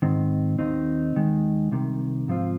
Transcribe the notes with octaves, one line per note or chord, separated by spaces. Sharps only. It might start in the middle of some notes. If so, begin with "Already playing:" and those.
G#2 D#3 C4
D#2 D#3 C4 D#4
D#2 D#3 G#3
C2 C3 D#3
G#2 F3 C4 F4